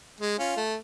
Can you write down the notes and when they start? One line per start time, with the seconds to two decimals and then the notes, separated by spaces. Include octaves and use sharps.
0.21 G#3
0.38 C#4 F4
0.57 A3